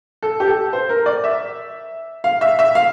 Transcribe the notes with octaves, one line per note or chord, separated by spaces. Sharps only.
A4
G4
A4
C5
A#4
D5
E5
F5
E5
E5
F5